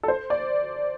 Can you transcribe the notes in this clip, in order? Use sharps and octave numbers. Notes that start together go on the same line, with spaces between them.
A4
C5
D5